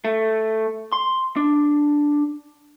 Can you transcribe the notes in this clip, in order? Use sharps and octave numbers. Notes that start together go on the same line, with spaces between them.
A3
C6
D4